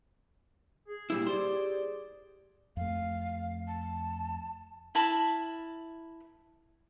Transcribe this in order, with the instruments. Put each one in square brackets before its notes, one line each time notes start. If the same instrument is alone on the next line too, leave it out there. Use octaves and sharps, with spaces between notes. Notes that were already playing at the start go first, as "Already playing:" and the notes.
[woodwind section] G#4
[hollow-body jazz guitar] A#2 G3 E4
[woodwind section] G4 G#4 D5 [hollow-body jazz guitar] C5
[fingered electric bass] F2 A3 [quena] F5
[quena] A5
[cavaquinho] E4 A#4 A5 B5